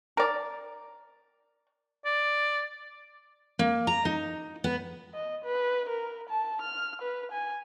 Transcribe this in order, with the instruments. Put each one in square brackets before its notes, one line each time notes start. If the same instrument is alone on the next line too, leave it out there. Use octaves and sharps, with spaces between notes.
[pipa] A#4 D5
[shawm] D5
[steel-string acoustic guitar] A#3
A#5
D#4
B3
[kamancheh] D#5
B4
A#4
A5
F6
B4
G#5